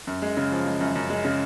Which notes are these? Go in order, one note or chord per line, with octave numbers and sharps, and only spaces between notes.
F#2
G#3
C#3
F3
G#3
F#2
F#2
G#3
C#3